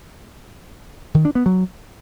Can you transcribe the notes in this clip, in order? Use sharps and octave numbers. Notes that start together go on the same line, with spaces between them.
D#3
D4
B3
F#3